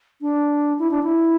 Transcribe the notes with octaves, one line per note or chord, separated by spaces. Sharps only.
D4
E4
D4
E4